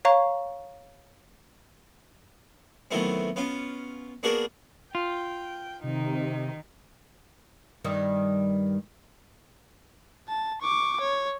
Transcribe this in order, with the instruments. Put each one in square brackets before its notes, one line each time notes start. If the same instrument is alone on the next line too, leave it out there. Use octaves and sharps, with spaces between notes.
[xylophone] C#5 F5 A#5 C#6
[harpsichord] D#3 E3 F#3 A3 B3 C4
B3 C#4 F4
A#3 B3 D4 F#4 G#4 A#4
[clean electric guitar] F4 [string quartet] G5
[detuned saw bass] C3 [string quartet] D#3 D#4
[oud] G2 D#3 G3
[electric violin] A5
C#6 D6
C#5